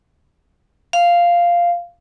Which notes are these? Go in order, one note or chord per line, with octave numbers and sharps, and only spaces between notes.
F5